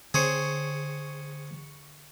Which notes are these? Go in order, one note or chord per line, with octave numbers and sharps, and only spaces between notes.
D3 G#4 C5 C#6 C#7